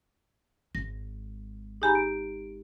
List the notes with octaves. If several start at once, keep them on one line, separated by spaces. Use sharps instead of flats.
G#1 A#6
D#4 G4 G#4 G#5 A#5 B5
D7